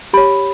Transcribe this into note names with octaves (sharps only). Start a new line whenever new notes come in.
G4 C#5 B5